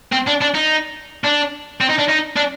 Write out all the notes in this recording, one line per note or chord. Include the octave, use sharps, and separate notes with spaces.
C4
D4
D4
D#4
D4
C4
D#4
D4
D#4
D4